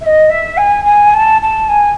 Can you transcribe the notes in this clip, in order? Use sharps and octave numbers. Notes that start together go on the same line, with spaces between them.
E5
D#5
E5
G#5
G#5
A5
A5
G#5